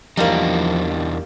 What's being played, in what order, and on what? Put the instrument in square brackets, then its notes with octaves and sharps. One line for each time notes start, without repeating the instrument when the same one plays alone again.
[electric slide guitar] E2 D4 D#4 [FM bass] F3 [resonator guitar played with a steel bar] G3 A#3